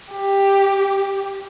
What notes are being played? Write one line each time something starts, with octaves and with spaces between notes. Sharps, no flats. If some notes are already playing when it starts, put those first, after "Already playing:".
G4